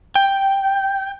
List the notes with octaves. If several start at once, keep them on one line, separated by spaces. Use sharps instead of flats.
G5